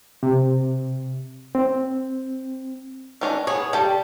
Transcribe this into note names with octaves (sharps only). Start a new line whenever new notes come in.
C3
C4
D#3 C#4 D4
B3 G#4 C#5
G3 A4 G5 A5